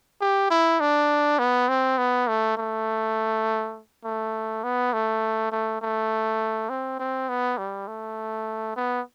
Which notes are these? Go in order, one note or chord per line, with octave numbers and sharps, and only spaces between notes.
G4
E4
D4
B3
C4
B3
A3
A3
A3
B3
A3
A3
A3
C4
C4
B3
G3
A3
B3